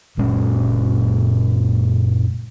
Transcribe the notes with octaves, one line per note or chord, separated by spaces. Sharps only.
F#1 A#2 G#3 C#4